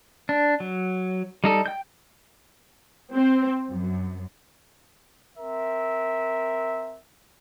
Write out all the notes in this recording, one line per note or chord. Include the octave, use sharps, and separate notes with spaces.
D4
F#3
G3 D#4 A4
G5 G6
C4
F#2
C4 A#4 E5